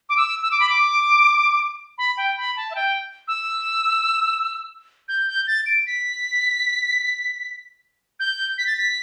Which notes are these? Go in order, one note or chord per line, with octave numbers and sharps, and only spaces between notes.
D6
E6
E6
D6
B5
D6
B5
G5
B5
A5
E5
G5
E6
G6
G6
A6
D7
B6
G6
B6
A6
B6